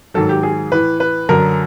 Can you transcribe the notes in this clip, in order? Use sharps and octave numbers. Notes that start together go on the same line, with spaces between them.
G#2 D#3 F#3 A4
G4
G#4
A2 E3 B4
B4
F#2 D3 F#3 A#4